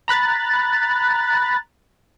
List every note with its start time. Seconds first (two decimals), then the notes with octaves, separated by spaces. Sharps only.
0.08 A#5 B5 F#6 A6